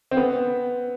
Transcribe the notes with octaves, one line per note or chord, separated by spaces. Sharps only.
C4
B3